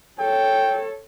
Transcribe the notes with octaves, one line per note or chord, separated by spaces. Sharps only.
A4 C#5 G5